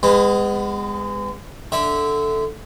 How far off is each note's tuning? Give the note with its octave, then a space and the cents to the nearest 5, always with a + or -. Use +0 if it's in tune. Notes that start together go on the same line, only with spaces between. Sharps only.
G#3 -30 B3 +25
D3 +0 E5 -15